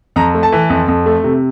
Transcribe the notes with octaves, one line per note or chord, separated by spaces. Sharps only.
F2 A#5
A3
A5
E3
F2
F2
A3
C3